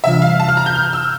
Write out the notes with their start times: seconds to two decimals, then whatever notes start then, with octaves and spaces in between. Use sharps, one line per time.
0.04 C3 E3 G3 D4 F4 E5
0.22 F5
0.40 A5
0.49 F6
0.57 A#5
0.66 G6
0.75 F6
0.93 E6